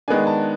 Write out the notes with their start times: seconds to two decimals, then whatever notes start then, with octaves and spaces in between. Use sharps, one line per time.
0.08 D#3 G#3 B3 D4 G#5
0.27 A5